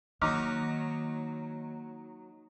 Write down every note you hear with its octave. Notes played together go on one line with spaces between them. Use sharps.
D#3 F#3 A#3 D#4 D6 F6